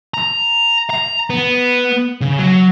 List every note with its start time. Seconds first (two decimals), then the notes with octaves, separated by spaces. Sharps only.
0.14 A#5
0.90 A#5
1.30 B3
2.21 C#3
2.38 F#3